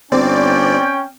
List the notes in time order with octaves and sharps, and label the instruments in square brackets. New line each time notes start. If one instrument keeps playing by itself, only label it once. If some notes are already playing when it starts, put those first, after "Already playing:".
[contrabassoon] G1 [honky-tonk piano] C4 [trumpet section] C#4 G5 [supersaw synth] D5